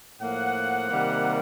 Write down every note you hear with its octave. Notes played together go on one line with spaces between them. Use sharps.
A2 F3 A#3 F#5
C3 D#3 G3 A#3